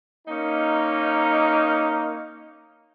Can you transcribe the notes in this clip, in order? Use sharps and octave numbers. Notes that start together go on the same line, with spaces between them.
A#3 C#4 D#4